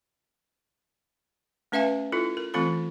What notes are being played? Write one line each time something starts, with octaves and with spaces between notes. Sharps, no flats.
A3 C#4 B4 E5 F5 G#5
E4 F4 A4
A#4
E3 A3 C4 F4 A4 B5